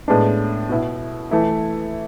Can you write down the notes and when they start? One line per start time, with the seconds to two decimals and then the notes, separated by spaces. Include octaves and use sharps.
0.08 A2 G#3 B3 D4
0.69 B2 B3 E4
1.31 E3 A3 E4